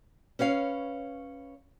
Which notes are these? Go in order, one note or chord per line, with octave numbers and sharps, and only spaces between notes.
C#4 B4 C#5 F5